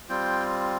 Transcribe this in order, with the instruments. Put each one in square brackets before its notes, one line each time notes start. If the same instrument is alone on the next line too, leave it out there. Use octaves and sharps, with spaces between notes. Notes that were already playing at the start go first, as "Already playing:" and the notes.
[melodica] G3 C4 F4 G5